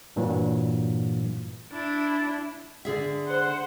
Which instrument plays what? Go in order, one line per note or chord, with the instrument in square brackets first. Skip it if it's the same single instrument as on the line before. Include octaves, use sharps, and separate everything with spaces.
[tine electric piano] G2 A#2 E3 F#3 A#3
[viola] D4 E4
[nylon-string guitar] D3 G#4 E5
[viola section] C5 F#5 C6